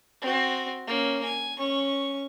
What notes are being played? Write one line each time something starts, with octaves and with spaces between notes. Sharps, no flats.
C4 F#4
A#3 C#4
G#5
C#4 C#6